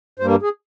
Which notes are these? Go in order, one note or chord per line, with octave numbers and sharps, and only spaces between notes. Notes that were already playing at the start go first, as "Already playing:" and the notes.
G2 G3 A#3 C5
G#4